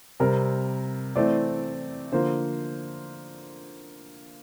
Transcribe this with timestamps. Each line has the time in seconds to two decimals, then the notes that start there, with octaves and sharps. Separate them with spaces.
0.20 C3 G3 C4 A#4
1.15 E3 A3 C4 D5
2.12 D3 F3 A#3 C5